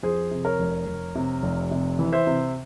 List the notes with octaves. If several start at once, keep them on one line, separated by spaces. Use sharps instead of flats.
F2 G#4 C5
C3
A#4 C#5
F1
F1
C3
F1
C3
E3
C5 E5
C3